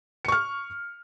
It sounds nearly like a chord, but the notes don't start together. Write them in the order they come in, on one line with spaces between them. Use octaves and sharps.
C#7 C#6 F6